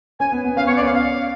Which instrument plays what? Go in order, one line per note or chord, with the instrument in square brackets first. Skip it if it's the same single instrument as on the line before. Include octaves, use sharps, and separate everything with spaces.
[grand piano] C#4 [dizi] G#5
[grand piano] B3
B3
[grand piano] C#4 [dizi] F5
[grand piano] B3 [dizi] C#5
[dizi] D5
[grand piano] C#4 [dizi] F5
[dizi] F5